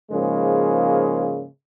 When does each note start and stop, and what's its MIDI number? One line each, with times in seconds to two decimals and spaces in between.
0.10 1.46 44
0.10 1.46 49
0.10 1.46 53
0.10 1.46 56
0.10 1.46 58